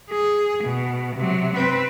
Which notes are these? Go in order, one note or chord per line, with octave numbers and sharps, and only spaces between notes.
G#4
B2
C3 F#3
C4 B4